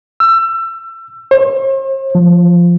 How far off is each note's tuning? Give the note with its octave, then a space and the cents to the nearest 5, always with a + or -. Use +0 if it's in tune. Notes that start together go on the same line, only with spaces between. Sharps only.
E6 +30
C5 +45
F3 -5